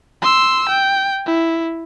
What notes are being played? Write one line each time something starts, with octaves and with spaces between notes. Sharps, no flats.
C6 E6
G5
E4